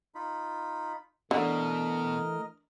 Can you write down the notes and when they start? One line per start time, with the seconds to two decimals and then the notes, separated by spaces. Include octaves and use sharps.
0.15 D#4 F4 B5
1.31 B2 D3 E3 A3 A#4 D#5 F6